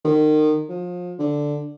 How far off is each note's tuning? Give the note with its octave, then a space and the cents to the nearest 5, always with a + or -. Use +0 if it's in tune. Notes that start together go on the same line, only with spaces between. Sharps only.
D#3 -30
F3 +30
D3 +0